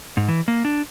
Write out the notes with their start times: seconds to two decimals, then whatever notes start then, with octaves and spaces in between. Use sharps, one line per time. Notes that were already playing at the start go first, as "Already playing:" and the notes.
0.17 G#2
0.28 E3
0.48 A#3
0.65 D4